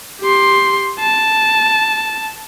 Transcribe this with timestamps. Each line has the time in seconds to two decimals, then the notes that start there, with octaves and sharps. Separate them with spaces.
0.21 G4 C6
1.00 A5